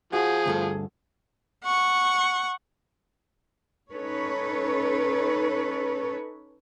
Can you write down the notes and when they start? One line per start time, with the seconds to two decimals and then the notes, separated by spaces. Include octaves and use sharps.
0.13 F3 F#4 G#4
0.46 D2 G2 A4
1.64 F#5 C#6
3.90 C#4 D#4 A4 B4 C#5